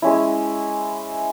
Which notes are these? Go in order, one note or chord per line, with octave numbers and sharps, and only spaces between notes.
G#3 C#4 E4